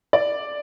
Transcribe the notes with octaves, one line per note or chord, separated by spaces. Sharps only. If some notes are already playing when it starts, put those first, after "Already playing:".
D5